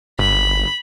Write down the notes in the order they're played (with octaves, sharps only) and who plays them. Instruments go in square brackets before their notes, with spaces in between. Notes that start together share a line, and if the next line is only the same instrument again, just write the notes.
[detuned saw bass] G1 [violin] B5